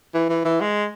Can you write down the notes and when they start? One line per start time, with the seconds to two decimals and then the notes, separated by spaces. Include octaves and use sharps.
0.14 E3
0.30 E3
0.45 E3
0.61 G#3